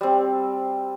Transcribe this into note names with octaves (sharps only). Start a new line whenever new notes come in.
G3 C4